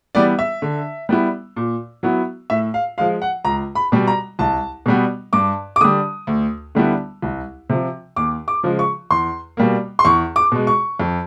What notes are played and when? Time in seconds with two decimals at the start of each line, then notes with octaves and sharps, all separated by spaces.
0.15 E3 G3 B3 D5
0.39 E5
0.62 D3
1.09 G3 B3 E4
1.56 A#2
2.03 F#3 B3 E4
2.50 A2 E5
2.74 F5
2.98 F3 G#3 F5
3.22 F#5
3.44 C#2 A#5
3.75 B5
3.92 B2 G3
4.07 A#5
4.39 C2 A5
4.86 B2 G3 B3
5.33 G2 D6
5.76 D6
5.81 D3 G3 D#6
6.27 D2
6.75 D3 G3 B3 E4
7.22 C2
7.70 C3 F3
8.16 D#2 D6
8.48 D6
8.63 C#3 F3 G#3
8.79 C#6
9.11 E2 C6
9.57 B2 G3 A#3
9.99 C6
10.05 E2 C#6
10.36 D6
10.52 B2 G#3
10.67 C#6
11.00 F2